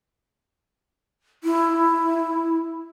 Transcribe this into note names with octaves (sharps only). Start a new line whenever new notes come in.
E4